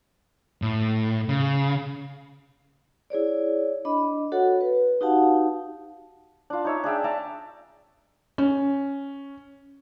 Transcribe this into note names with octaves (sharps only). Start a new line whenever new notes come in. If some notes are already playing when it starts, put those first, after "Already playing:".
A2
C#3
E4 G#4 C#5 D5
D4 D#5 B5
F#4 A4 C#5 F#5
B4
D#4 F#4 G4 F5 F#5 A5
D4 F4
D#4 C#5 E5
D4 G#4 E5 G5
D5 E5 A5 A#5
C#4